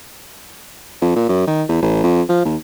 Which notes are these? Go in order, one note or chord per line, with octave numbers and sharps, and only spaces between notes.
F2
A#2
F#2
D#3
E2
A1
F2
F3
D#2